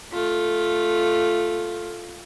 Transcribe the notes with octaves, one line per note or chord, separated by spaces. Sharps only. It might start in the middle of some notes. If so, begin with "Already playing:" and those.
A3 F4